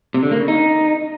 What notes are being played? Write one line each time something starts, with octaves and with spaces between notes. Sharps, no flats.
C3
D3
A#3
C#3
D#4